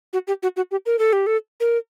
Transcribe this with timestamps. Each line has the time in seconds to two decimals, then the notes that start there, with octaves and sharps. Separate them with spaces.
0.13 F#4
0.27 G4
0.43 F#4
0.57 F#4
0.71 G4
0.86 A#4
0.99 A4
1.13 G4
1.27 A4
1.60 A#4